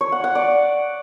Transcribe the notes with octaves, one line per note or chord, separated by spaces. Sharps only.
C#5
F#5
F#5
D5